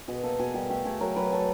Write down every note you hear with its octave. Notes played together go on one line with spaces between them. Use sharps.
B2 G#4
A#3 A4
B2 G#4
G3 G4
A3 G4
A3 G#4
F#3 A#4
F#3 B4
F#3 A4